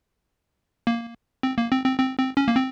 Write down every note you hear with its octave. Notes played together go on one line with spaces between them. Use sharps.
A#3
C4
A#3
C4
C4
C4
C4
C#4
A#3
C4